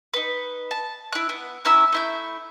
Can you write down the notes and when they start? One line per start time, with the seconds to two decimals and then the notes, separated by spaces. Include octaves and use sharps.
0.14 D#4 B4
0.71 A5
1.13 E4 F#6
1.29 B3
1.65 C#4 E4 A#5 E6
1.92 A3 E4 G6